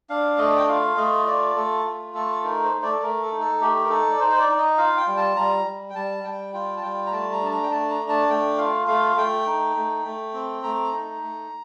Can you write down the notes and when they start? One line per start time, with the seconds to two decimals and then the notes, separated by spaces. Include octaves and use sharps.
0.10 D4 F5
0.38 A3 D#5
0.57 G5
0.68 F4 F5
0.97 A3 D#5
1.26 F4 D5
1.56 A3 A4
1.85 F4
2.14 A3 A4
2.44 D#4 A#4
2.64 C5
2.73 A3
2.82 D5
2.92 A4
3.02 A3 A#4
3.22 A4
3.32 D#4
3.41 A4
3.61 A3 G4
3.84 A#4
3.89 D#4 A4
4.11 D5
4.19 D#4 C5
4.30 C5
4.39 D5
4.49 D#4
4.58 D#5
4.78 F4 F5
4.97 G5
5.07 G3
5.17 A5
5.36 G3 A#5
5.66 G3
5.90 G5
5.95 G3 A5
6.24 G3 G5
6.54 F4 G5
6.77 A5
6.83 G3 G5
7.06 A#5
7.12 A3 A5
7.32 A#5
7.41 D4 A5
7.51 A#5
7.63 G5
7.70 A3 A5
7.90 A#5
8.00 D4
8.09 A5
8.29 A3 G5
8.58 F4 F5
8.88 A3 F5
9.09 F5
9.17 A3 G5
9.47 D#4
9.76 A3
10.05 A3
10.33 C4
10.63 A3 A#5
10.92 D#4
11.22 A3